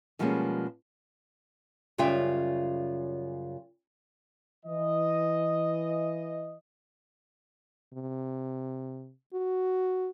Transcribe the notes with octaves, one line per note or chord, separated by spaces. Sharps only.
B2 F3 G3 G#3 A#3 C#4
F#2 C#3 G3 F4 E5 G5
E3 D#5
C3
F#4